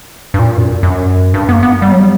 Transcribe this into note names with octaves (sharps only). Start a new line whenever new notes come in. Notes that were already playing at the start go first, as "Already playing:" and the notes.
G2
A#2
F#2
F#2
G2
B3
A#3
B3
G3
F#3
G3